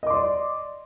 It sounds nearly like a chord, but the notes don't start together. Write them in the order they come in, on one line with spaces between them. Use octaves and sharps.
D#5 D6 C6 D5